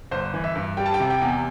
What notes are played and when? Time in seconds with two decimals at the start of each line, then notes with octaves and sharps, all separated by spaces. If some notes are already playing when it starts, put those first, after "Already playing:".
0.11 G1 C5
0.34 E3
0.44 E5
0.56 G2
0.77 G3 G5
0.86 A5
0.94 G5
1.00 C3
1.10 G5
1.22 E2